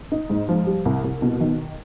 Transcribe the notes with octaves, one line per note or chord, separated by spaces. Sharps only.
D#4
G#2
F3
G3
C2
C2
B2
D#3